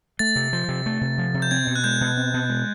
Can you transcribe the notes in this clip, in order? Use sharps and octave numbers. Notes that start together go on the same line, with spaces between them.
A3 A6
C3
F3
C3
A3
C3
F3
C3
G6
C4 G#6
B2
F#6
G#3 G6
B2
C4
B2
G#3